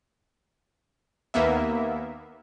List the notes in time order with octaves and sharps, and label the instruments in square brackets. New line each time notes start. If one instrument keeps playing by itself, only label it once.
[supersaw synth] D#2 A#3 B3 E5